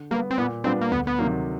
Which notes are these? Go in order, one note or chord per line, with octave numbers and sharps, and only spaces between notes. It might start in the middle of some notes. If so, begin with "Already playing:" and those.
Already playing: D3
G3 A#3 B3
C4
A#2 B3
G3 B3 C4 D4 F4
A#3
D2 B3
B3
C3 D#3 F#3 A#3